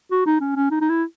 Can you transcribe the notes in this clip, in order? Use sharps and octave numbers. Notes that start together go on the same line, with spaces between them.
F#4
D#4
C#4
C#4
D#4
D#4
E4